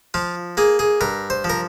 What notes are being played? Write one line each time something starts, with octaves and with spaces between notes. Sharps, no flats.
F3 F4
A#3 G#4
G#4
G2 A#4
C5
F3
A#4